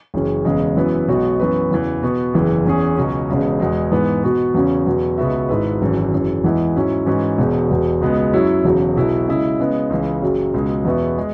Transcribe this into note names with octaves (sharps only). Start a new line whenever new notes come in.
F#1 F#2 E3 C#4
E1 E2 C#3 G#3
F#2 E3 B3 E4 B4
B1 B2 G#3 B3 F#4
F#2 E3 B3 F#4 B4
E2 C#3 E3
B2 B3 F#4
F#1 E2 E3
E2 E3 C#4 G#4
C#2 B2 F#3 C#4
E1 E2 C#3 G#3
E2 B2 G#3
G#2 E3 B3
B2 B3 F#4
E2 C#3 F#3 C#4
E2 B2 F#3
C#2 B2 B3 F#4 E5
G#1 G#2 G#3 E4 B4
G#1 F#2 E3
F#1 F#2 E3
E2 E3 G#3 E4
G#2 F#3 C#4 E4
G#2 E3 C#4 F#4
E1 E2 B2
E1 E2 B2
C#2 B2 G#3 B3
F#2 F#3 E4 C#5
E1 E2 C#3 F#3
B1 B2 F#3 E4
C#3 G#3 E4
C#3 G#3 B3
C#2 C#3 E3
F#1 F#2 F#3
C#2 B2 G#3
E2 B2 B3 F#4 E5
G#3